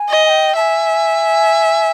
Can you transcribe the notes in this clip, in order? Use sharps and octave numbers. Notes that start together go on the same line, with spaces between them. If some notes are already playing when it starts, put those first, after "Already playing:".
Already playing: G#5
D#5
G#5
G5
E5 A5
G#5